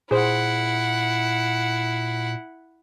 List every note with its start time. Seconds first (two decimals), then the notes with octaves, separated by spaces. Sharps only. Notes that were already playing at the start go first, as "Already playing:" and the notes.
0.11 A#2 E4 G#4 C5 F#5